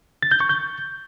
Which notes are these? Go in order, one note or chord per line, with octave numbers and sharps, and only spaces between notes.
A6
G6
C#6
G6